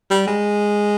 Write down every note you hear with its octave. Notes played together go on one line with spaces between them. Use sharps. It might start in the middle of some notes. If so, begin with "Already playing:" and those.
G3
G#3